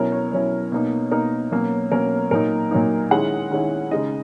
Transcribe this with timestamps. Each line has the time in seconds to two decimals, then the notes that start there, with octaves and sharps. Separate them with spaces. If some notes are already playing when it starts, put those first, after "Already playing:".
Already playing: B2 F#3 C#4 E4 A#4
0.12 C#5
0.32 B2 F#3 C#4 E4 C#5
0.72 B2 A#3 D#4
1.11 B2 A#3 D#4 A#4
1.52 B2 F#3 A#3 C#4
1.92 B2 F#3 A#3 C#4 A#4
2.31 A#2 F#3 A#3 D#4 A#4
2.71 A#2 F#3 A#3 D#4
3.11 D#3 G#3 C#4 E4 F#5
3.51 D#3 G#3 C#4 E4
3.91 C#3 G#3 D#4 D#5